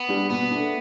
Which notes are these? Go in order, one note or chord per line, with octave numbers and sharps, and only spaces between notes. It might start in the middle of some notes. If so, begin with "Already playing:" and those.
Already playing: B3
G3 D4 G4
B2 B3
A3 D4